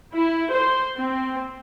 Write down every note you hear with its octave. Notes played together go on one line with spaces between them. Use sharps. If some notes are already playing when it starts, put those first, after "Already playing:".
E4
C5
C4